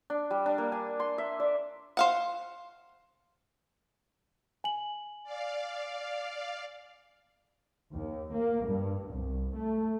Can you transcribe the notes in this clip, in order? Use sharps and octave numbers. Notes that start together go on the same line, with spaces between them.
D4
G3
D4
A#3
G#5
C6
E5
D5
C5 F5 F#5
G#5 F#7
D5 F5
D#2
A#3
G2
C2
A3